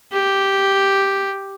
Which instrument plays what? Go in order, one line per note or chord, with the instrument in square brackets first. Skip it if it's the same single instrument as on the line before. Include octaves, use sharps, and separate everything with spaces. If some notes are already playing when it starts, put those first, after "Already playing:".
[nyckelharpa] G4